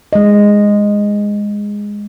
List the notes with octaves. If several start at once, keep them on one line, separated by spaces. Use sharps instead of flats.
G#3 D#5